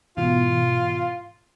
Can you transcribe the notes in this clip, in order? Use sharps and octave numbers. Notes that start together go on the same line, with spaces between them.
G#2 B2 E3 F4